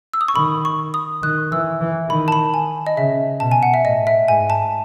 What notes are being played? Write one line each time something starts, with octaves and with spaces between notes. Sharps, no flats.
E6
D#6
C#6
D#3 B5
C#6
D#6
D#3 F#6
E3 E6
E3
D#3 B5
A5
B5
G#5
D#5
C#3 E5
B2 A5
G#5
F#5
E5
A2 D#5
E5
G#2 G#5
A5